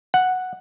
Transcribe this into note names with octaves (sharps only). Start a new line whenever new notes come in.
F#5